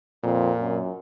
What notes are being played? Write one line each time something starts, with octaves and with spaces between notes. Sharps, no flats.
F2 A#2
F#2